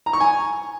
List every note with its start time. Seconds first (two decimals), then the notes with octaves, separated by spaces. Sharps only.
0.06 A#5
0.13 C#6
0.20 G#5